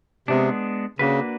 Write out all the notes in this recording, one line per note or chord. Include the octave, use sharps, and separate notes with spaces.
C3 G#3 B3 D4
C#3 A#3 D4 F#4 B4